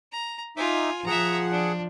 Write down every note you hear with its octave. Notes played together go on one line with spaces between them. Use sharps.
A#5
D#4 F4 E5 G#5 D6
F3 G#4 E5 F#5 A#5
D4